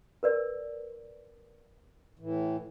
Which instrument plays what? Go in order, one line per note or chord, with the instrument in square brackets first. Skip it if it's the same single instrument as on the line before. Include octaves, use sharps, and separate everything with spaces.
[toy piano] A#4 B4 D5
[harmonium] A2 E3